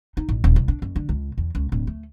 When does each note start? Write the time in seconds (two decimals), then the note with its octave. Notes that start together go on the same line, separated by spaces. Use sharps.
0.17 D#4
0.29 A1
0.44 D#1
0.56 C2
0.68 D4
0.82 F#1
0.96 D3
1.09 C#2
1.38 E2
1.55 C#2
1.72 D1
1.87 A3